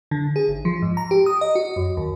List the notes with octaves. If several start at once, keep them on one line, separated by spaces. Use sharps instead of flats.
D3
G#4
G#1
F3
G#2
A#5
G4
D#6
D#5
F#4
F#2
D#2